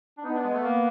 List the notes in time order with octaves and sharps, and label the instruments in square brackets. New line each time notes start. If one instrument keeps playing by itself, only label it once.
[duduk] D4
[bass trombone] B3 [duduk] D#4
[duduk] D4
G#3
A3
A#3